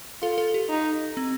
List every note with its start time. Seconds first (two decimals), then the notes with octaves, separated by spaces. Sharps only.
0.22 F4 A4
0.38 A4
0.54 G4
0.70 D#4
1.17 C4